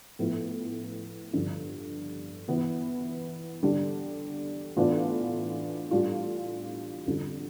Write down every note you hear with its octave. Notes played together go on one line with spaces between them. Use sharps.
A2 F3 B3 E4
G2 D3 F3
E3 B3 E4
D3 G3 D4
A2 E3 B3 D4 F4
A2 G3 D4 F4
F2 D3 G3